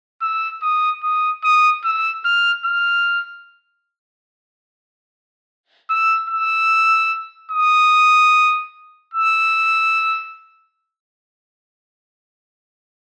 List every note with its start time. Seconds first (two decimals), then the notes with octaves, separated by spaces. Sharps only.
0.22 E6
0.62 D#6
1.03 D#6
1.44 D#6
1.85 E6
2.25 F6
2.65 F6
5.90 E6
6.30 E6
7.52 D#6
9.14 E6